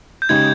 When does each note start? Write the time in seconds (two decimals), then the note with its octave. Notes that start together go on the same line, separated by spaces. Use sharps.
0.22 G6
0.29 C#3 G#3 D#4 G4 G#6